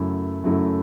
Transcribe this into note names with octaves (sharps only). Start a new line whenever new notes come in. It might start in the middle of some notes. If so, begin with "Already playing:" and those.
Already playing: F#2 C#3 F#3 A3 E4
F#2 C#3 F#3 A3 E4